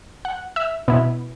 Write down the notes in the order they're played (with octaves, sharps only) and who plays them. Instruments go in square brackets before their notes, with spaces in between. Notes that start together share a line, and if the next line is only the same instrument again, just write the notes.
[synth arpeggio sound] F#5
E5
B2 B3 E4